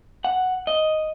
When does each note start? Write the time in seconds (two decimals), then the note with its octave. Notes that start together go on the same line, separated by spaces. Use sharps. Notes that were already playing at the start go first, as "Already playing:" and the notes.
0.25 F#5
0.67 D#5